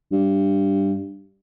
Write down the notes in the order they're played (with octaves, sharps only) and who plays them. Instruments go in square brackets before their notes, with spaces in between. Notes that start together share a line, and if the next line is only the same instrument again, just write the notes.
[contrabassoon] G2